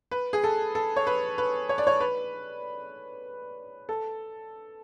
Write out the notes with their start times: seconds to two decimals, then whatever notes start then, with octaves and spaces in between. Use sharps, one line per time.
0.11 B4
0.33 G#4
0.44 A4
0.75 A4
0.96 C#5
1.07 B4
1.38 B4
1.69 C#5
1.78 D5
1.87 C#5
2.01 B4
3.89 A4